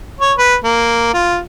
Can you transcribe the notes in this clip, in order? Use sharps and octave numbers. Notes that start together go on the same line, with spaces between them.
C#5
B4
A#3
F4